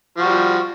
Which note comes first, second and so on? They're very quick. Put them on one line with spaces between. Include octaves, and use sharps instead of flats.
F3 F#4 G3